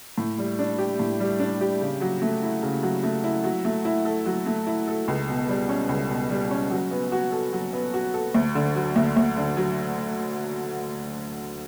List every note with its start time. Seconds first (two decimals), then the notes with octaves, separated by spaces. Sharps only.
0.18 A2
0.38 G3
0.59 D4
0.78 G4
1.00 A2
1.20 G3
1.40 D4
1.61 G4
1.81 C#3
2.01 F#3
2.22 A3
2.43 E4
2.63 C#3
2.83 F#3
3.04 A3
3.24 E4
3.44 F#3
3.65 A3
3.85 E4
4.05 A4
4.26 F#3
4.46 A3
4.67 E4
4.88 A4
5.08 C#2
5.28 B2
5.49 G3
5.69 C#4
5.89 C#2
6.09 B2
6.30 G3
6.51 C#4
6.71 F#3
6.91 B3
7.12 F#4
7.32 A4
7.53 F#3
7.73 B3
7.94 F#4
8.14 A4
8.34 D2
8.55 D3
8.75 F#3
8.96 D2
9.17 D2
9.37 D3
9.57 F#3